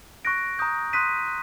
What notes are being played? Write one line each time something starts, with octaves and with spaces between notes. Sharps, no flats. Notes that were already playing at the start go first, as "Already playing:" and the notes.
C#6 F#6 A#6 D7
A#5 D#6 G6
C6 D#6 F#6 B6 D#7
F#6